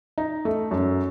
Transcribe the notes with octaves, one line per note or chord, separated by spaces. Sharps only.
D#4
A3
F#2